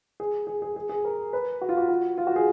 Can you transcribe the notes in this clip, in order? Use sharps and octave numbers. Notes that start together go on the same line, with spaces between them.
G#4
G#4
G#4
G#4
G#4
A#4
B4
F#4
F4
F#4
F#4
F4
F#4
G#4